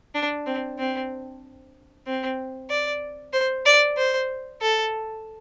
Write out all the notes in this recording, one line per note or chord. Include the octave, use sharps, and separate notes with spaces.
D4
C4
C4
C4
D5
C5
D5
C5
A4